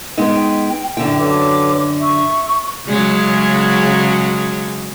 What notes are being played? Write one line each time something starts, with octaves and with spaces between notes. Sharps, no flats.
G#3 B3 D#4 G5
F#2 D3 E4 G5
F#3 A4 B4 D6
E5 C#6
C#3 F#3 G#3